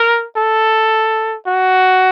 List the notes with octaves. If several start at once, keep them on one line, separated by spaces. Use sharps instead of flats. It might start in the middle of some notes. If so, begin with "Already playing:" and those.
Already playing: A#4
A4
F#4